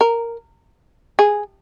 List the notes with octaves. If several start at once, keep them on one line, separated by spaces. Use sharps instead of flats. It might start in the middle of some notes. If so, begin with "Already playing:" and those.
A#4
G#4